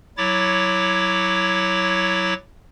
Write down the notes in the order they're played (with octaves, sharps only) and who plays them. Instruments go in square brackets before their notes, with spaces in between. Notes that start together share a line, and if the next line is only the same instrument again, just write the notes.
[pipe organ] F#3 E4 C#5 D6 A6